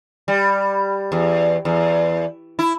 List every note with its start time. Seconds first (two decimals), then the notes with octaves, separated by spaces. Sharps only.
0.28 G3
1.12 E2
1.65 E2
2.59 E4